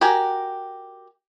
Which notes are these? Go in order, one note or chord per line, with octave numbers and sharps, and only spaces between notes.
F#4 G4 A#4 G5 G#5